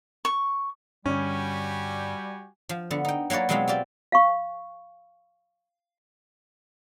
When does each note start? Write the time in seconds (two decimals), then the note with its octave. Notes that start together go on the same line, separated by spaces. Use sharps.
0.25 C#6
1.06 G2 D3 G3 C#4 F#4 G4 G#5
2.69 F3
2.91 D3 B3
3.05 D#4 G5
3.30 F#3 A#3 B4 C#5 D5
3.49 B2 F#3 G#3 B3 C4 F4
3.68 F4 G4 D5 E5
4.12 F5 C#6